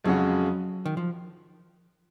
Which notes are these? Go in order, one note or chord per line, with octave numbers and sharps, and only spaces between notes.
F2 C#3 F#3 G#3 C#4 F#4
D#3
F3